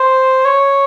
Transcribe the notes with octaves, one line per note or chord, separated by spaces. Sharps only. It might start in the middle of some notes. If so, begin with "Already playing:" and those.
Already playing: C5
C#5